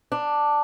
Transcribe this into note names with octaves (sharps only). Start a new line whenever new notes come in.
D4